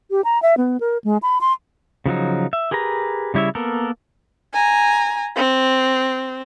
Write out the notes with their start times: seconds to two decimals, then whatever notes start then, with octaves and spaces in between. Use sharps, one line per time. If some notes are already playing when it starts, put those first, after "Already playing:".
0.11 G4
0.24 A#5
0.42 E5
0.57 B3
0.80 A#4
1.04 G#3
1.22 B5
1.41 C6
2.06 C#3 F3 F#3 D#4
2.53 E5
2.71 G4 G#4 A#4 B4 A#5
3.34 C#3 G3 E4 C#5 E5
3.55 A#3 B3 A4 A#4
4.53 G#5 A#5
5.36 C4